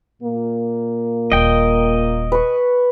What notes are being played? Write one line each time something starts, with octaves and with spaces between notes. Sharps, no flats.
A#2 A#3
D#1 D#5 G5
B4 C#6